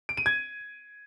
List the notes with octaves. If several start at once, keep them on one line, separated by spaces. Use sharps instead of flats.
D7
D#7
G#6